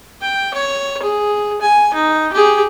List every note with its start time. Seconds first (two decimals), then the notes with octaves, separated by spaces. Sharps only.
0.22 G5
0.54 C#5
1.02 G#4
1.61 G#5
1.94 D#4
2.33 G4 G#4